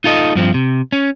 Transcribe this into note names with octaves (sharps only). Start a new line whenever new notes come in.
D#4 F4 A4 D#5
G2 F3 C4
C3
C#4